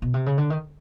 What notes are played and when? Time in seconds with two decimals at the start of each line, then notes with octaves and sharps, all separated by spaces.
0.02 B2
0.14 C3
0.26 C#3
0.38 D3
0.50 D#3